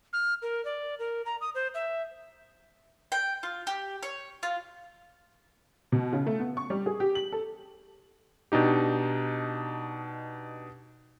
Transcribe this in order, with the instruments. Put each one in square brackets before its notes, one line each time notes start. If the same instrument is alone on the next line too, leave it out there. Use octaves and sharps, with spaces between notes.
[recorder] F6
A#4
D5
A#4
A#5
D#6
C5
E5
[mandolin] G5
F4
G4
C#5
F4
[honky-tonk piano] B2
C#3
A3
B3
C#6
G3
G#4
G4
F#7
A4
[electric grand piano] B2 D4 D#4 G4